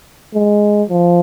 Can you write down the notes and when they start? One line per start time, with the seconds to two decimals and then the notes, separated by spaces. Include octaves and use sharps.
0.34 G#3
0.90 F3